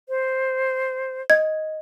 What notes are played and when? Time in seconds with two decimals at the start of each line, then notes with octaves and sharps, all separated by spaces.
0.09 C5
1.30 D#5 G#6